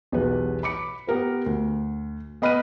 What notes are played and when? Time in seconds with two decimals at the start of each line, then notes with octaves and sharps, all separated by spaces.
0.12 B1 E2 B2 G4 B4
0.63 B5 D6 C#7
1.07 B3 G4 A#4 B4
1.46 D2
2.42 B3 D#5 B5 F6 F#6 D#7